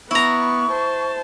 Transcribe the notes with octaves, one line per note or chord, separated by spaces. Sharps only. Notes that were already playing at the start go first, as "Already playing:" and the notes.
B3 E4 A#5 C#6
C5 A5